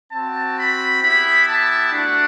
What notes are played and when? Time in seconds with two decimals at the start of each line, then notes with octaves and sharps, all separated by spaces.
0.11 C4 F#4 A5
0.57 B5
1.02 B3 E4 G4 B5
1.47 A5
1.92 A3 D4 F#4 F#5